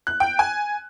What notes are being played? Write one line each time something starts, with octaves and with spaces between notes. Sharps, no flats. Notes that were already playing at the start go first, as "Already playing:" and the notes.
F#6
G5
G#5